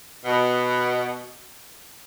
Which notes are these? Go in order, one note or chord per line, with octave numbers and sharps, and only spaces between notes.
B2